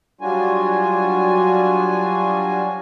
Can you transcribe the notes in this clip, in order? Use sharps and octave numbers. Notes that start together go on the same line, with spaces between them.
F#3 G3 D4 F4 F#4 G#5